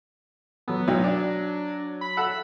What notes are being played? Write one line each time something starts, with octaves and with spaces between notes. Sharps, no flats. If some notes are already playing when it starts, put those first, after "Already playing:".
F#3 B3 A4
B1 F#3
D4 D5
B5
A4 F#5 E6